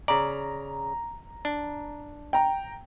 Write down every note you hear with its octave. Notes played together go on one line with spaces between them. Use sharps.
C#3 D5 A#5
D4
G5 A#5